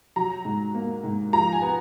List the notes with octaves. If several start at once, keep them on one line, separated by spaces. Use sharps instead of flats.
F#3 A#5
G#2
A#3
G#2
F3 A#5
G#5
B3